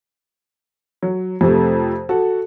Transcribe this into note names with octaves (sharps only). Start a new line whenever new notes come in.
F#3
F2 C3 A3
F#4 A4